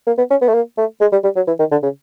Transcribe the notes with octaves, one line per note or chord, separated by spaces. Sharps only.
A#3
B3
C#4
B3
A3
A#3
A3
G#3
G3
G3
F#3
E3
D#3
D3
C#3